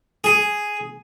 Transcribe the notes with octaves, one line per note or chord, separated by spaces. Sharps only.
G#4